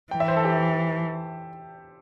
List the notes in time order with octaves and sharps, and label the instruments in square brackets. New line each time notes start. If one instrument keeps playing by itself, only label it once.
[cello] E3 [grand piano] G5
[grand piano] E5
C5
A4
G4